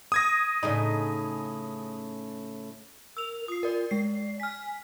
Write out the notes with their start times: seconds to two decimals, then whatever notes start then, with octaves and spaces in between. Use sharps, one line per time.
0.12 D#6 G#6 A#6
0.63 A2 C#3 D#4
3.17 A#4 E6 F7
3.48 F4 D#6 C7
3.63 A#4 D5
3.91 G#3 D5 C7
4.40 G#5 F6 B6